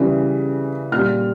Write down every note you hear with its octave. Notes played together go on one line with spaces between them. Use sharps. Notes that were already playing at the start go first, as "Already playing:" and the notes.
Already playing: C#3 E3 G3
A#2 G3 F6